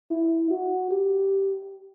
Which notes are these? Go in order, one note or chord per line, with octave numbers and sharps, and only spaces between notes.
E4
F#4
G4